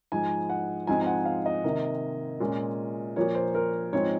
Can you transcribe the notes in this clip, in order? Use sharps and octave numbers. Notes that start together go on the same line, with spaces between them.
G#2 F3 G#3 G#5
F#5
G#2 F3 G#3 C4 G#5
G#5
F#5
F5
D#5
C3 D#3 A#3
A#2 G#3 C#4
A#2 F3 A#3 C#5
C5
A#4
G#2 F3 G#3 C4 C#5